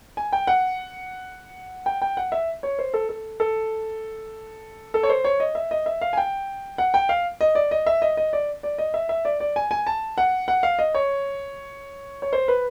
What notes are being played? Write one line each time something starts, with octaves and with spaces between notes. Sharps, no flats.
G#5
G5
F#5
G5
G5
F#5
E5
C#5
C5
A4
A4
A4
A4
C#5
C5
C#5
D#5
E5
D#5
E5
F5
G#5
G5
F#5
G5
F5
D#5
D5
D#5
E5
D#5
D#5
D5
D5
D#5
E5
E5
D5
D5
G#5
G#5
A5
F#5
F#5
F5
D#5
C#5
C#5
C5
B4